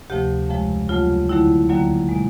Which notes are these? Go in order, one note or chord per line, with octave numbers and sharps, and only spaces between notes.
D2 C3 F3 A3 G4
F2 C#3 F3 G#3
D2 C#3 F#3 A3 F4
D#2 D3 F#3 A3 E4
D#2 D3 F#3 A#3
B2 G#3